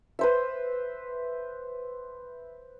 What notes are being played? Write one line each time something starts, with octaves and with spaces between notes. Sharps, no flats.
B4 C5 E5